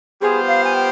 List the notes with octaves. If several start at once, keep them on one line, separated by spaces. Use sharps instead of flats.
G3 B3 F4 G#4 C5
F5
G#5
G5